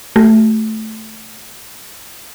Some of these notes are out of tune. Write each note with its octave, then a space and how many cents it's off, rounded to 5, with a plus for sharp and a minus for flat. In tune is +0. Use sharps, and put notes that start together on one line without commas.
A3 +0 G4 -40